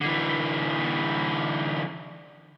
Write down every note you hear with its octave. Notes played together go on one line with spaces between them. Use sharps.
D3 E3